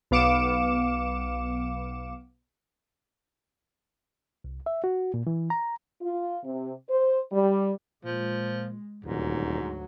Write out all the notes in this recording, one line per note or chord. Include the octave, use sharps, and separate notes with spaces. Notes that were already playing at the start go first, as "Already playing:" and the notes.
B1 B3 F5 D6 C#7 E7
C2
E5
F#4
A#2
E3
A#5
F4
C3
C5
G3
A#2 F3 G#3
D#1 D2 G#2 F#3